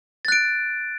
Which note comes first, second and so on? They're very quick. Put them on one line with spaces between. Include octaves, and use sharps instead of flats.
A6 F#6 D7